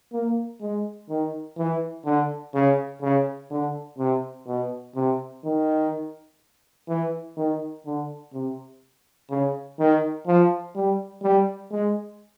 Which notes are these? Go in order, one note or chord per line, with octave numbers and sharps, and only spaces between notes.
A#3
G#3
D#3
E3
D3
C#3
C#3
D3
C3
B2
C3
D#3
E3
D#3
D3
C3
C#3
D#3
F3
G3
G3
G#3